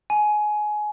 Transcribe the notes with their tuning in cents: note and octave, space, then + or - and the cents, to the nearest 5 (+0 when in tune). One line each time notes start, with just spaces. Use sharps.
G#5 +20